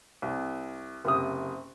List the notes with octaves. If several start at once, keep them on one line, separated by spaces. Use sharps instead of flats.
C2
F#1 C3 D#6